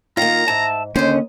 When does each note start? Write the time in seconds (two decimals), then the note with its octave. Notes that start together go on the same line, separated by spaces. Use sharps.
0.17 D#3 A#3 F4 F5 A#5
0.48 G#2 E5 A5
0.96 D#2 D3 A#3 C#4 C5 D#5